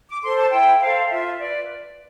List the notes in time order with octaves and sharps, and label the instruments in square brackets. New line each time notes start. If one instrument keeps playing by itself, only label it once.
[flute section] D6
A4 C5 C6
A5
E4 G5
A4 C5 F5
F4 E5
B4 D5